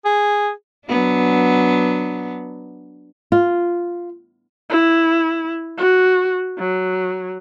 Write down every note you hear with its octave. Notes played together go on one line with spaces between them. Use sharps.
G#4
F#3 B3 D4
F4
E4
F#4
F#3